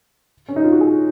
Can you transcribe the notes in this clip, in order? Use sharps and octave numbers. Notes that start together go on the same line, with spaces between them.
C#4
D#4
F4
F#4
G#4